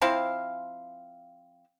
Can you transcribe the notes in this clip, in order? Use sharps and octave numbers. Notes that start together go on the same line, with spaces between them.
F3 C4 E4 F5